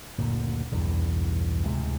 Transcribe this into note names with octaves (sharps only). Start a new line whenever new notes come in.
F#1 D2 A#2
B1 E2 G2
D2 A2 C3 G#3